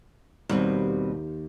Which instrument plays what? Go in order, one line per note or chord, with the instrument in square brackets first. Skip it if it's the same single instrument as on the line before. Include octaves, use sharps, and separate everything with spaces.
[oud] D#2 [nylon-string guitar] B2 G3 C4